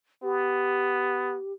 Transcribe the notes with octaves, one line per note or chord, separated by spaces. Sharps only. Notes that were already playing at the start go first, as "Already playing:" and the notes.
B3 G4